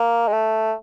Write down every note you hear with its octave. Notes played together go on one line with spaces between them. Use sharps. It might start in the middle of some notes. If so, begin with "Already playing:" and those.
Already playing: A#3
G#3
A3